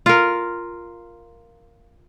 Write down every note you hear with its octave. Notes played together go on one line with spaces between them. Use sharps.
F4 A#4